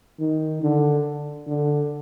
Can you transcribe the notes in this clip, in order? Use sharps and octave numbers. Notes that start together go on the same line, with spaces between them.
D#3
D3
D3